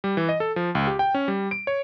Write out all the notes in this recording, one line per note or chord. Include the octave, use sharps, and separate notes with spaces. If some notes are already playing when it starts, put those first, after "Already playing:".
G3
E3
D#5
A4
F3
C#2
G4
G5
C#4
G3
D7
C#5